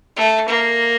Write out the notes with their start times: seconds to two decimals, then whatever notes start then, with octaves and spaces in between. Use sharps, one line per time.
0.17 A3
0.48 A#3